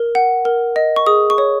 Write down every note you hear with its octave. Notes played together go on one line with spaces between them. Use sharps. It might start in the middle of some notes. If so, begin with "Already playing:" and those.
Already playing: A#4
F#5
A#4
D#5
C#6
G#4 D#6
C#6
C#5